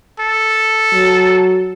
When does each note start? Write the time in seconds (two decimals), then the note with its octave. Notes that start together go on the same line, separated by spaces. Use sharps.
0.20 A4
0.94 F#3